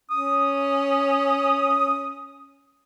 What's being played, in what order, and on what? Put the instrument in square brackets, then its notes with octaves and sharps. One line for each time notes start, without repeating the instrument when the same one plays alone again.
[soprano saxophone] C#4 [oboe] D#6